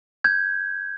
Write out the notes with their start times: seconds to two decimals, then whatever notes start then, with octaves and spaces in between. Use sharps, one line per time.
0.24 G6 G#6